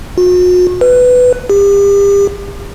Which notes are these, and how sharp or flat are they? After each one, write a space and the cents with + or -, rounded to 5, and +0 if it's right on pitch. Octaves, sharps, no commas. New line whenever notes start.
F#4 -40
B4 +10
G4 +35